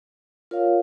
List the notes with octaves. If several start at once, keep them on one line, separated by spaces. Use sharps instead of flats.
F4 A#4 C#5 F5